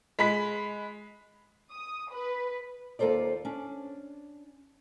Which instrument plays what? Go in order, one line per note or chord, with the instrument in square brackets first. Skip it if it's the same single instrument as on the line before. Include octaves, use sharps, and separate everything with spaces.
[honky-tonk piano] G#3 B5 B6
[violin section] D#6
B4
[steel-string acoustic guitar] D#2 A#3 F4 A4 C5 D5
C#4 D4